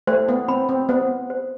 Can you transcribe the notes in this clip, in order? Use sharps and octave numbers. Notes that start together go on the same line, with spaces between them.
A3 C5
B3
C4 B5
C4
B3 C5
C5